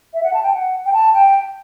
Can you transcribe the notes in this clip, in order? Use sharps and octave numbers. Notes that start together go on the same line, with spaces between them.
E5
F#5
A5
G5
F#5
G5
A5
G5